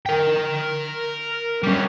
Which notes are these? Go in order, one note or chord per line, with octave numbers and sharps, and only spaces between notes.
A#4 G5
G3 C#4